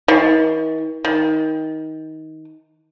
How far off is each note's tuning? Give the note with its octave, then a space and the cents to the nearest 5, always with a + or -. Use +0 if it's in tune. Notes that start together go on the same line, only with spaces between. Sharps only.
D#3 +40
D#3 +20